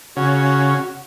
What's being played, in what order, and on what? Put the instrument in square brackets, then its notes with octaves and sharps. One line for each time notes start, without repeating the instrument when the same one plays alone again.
[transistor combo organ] C#3 [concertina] F#4